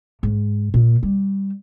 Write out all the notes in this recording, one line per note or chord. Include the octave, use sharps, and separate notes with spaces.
G#2
A#2
G3